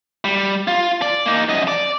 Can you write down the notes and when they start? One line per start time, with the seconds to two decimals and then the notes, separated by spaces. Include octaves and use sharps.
0.25 G3
0.68 F4
1.02 D5
1.26 A#3 D#4
1.49 F#2 D#5
1.68 D5